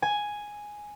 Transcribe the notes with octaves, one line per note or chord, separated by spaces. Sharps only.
G#5